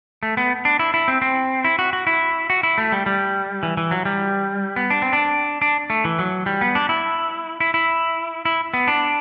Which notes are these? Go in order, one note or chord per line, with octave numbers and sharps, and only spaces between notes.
A3
B3
D4
E4
E4
C4
C4
E4
F#4
F#4
E4
F#4
E4
A3
G3
G3
E3
E3
F#3
G3
B3
D4
C4
D4
D4
A3
E3
F#3
G3
B3
D4
E4
E4
E4
E4
B3
D4